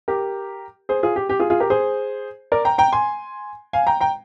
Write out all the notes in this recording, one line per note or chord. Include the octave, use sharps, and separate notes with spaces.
G4 A#4
G#4 C5
F4 G#4
G4
G4
F4 G#4
F4 G#4
G4 A#4
G#4 C5
A#4 D5
G5 A#5
G5 A#5
G#5 C6
F5 G#5
G5 A#5
G5 A#5